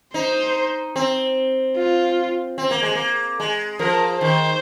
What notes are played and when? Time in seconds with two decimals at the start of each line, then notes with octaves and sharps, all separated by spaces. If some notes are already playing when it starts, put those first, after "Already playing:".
0.14 D#4 C5
0.96 C4
1.77 F4
2.58 C4
2.71 A#3
2.83 G#3
2.95 A#3
3.40 G#3
3.79 F3 A#4
4.20 D#3 C5